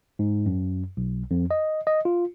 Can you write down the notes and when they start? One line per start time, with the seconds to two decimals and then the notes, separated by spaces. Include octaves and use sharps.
0.19 G#2
0.46 F#2
0.97 B1
1.31 F2
1.51 D#5
1.87 D#5
2.05 F4